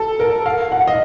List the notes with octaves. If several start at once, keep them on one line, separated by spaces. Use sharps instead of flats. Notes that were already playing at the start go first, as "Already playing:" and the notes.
Already playing: A4
A#4
F5
F#5
D#5